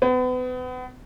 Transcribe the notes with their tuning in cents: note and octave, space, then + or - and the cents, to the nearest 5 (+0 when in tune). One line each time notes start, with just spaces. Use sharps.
B3 +35